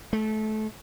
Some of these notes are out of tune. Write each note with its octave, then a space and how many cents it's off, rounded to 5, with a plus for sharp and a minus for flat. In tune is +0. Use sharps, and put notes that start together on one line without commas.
A3 -25